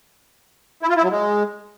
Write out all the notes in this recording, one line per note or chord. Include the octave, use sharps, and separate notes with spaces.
E4
F4
E4
F#3
G#3